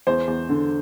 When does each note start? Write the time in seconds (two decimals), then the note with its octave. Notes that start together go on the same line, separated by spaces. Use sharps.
0.07 E2 C5
0.27 E2
0.49 D3